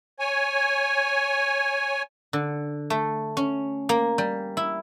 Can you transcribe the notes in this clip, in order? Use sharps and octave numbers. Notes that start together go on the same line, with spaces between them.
C#5 G#5
D3
A3
C#4
A#3
G3
E4